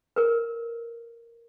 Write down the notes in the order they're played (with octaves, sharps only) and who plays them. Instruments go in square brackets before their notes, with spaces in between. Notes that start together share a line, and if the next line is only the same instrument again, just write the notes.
[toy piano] A#4 B4